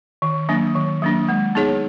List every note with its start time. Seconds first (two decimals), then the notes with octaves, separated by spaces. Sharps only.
0.22 D#3
0.49 F#3 A#3 D4
0.76 D#3
1.02 F#3 A#3 D4
1.29 G#3
1.55 B3 D#4 G#4 C#5